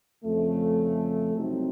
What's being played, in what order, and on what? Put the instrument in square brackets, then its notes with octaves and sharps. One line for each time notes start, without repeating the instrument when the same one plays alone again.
[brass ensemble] F2 C#3 A3
C2 C3 F#3 C4 D#4